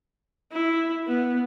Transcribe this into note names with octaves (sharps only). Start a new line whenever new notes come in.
E4
B3